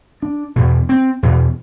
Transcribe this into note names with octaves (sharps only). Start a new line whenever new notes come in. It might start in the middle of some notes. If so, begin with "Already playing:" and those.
D4
E2 B2
C4
E2 B2